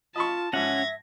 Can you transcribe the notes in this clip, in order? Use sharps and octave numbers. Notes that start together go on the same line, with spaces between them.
F4 D#5 A5 B5 C#6
G#2 F3 C#4 E5 F#5 G#6 A#6